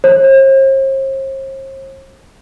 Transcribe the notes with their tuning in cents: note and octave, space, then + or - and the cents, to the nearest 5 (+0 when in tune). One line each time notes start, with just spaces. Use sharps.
C5 +45